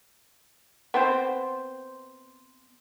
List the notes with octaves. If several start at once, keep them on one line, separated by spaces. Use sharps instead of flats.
B3 C4 C5